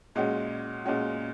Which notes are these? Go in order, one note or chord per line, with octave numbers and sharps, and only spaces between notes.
A#2 G#3 C#4 F#4
A#2 G#3 C#4 F#4